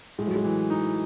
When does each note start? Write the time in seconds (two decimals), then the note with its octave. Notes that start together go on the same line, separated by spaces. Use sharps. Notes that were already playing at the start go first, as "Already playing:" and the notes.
0.18 A2 G#3
0.27 F#3
0.35 G#3
0.44 E3
0.70 D#4